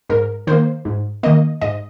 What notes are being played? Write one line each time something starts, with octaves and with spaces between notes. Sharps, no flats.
G#2 A#4
D#3 A#3 C5
G#2
D#3 A#3 D#5
G#2 D#5